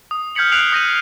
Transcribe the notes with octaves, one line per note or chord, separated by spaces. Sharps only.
D#6
F6 G6 G#6 B6 C#7 F#7
F6 F#6 C7 D7 F7 F#7
D#6 G6 A#6 C#7 D#7 F#7